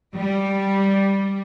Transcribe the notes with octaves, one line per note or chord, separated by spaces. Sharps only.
G3